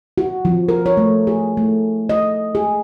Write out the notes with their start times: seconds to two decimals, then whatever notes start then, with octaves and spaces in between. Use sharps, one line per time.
0.18 F#4
0.45 F3
0.69 A#4
0.86 C#5
0.97 A3
1.27 G#4
1.57 A3
2.09 D#5
2.55 G#4